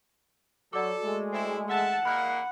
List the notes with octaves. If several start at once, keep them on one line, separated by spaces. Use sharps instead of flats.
F#3 F#4 A4 D5 D6
G#3 A3
C4 E4
E5 F#5 A5
A#2 G#3 A#3 B5 F#6